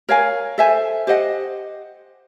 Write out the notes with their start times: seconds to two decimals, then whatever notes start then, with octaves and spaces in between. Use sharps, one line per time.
0.09 A#4 C#5 F5 G#5
0.58 A4 C5 E5 G#5
1.07 G4 C5 D#5 F#5